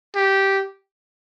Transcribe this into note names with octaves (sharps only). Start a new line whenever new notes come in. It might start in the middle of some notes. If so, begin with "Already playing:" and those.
G4